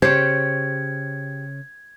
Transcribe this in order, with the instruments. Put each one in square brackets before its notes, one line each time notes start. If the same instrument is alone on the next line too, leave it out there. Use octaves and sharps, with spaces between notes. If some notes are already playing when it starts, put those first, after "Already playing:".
[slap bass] C#3 [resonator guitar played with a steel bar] G4 C#5 [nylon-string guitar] C5 [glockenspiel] G#6